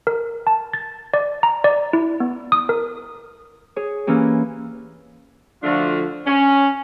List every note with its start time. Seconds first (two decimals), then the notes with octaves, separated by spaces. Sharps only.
0.07 A#4
0.47 A5
0.73 A6
1.14 D5
1.43 A#5
1.64 D5
1.93 E4
2.20 B3
2.52 D#6
2.69 A#4
3.76 G#4 C#5
4.07 E3 A#3 C#4 G4
5.64 D3 F3 A3 D4 F4 F#4
6.27 C#4